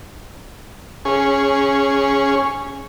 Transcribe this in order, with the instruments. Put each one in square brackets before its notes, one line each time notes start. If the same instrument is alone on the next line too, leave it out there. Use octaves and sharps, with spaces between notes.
[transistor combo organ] C#4 G#4